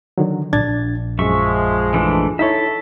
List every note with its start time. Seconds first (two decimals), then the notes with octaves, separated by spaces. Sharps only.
0.18 D3 D#3 F#3
0.53 A#1 D4 G#6 A6
1.19 F#2 F3 G#3 E5 C#6
1.94 E3 A3 D4
2.39 D#4 E4 A4 C#5 E5